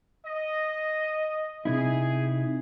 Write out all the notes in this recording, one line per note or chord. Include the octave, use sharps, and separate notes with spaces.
D#5
C3 D#4 E4 G#4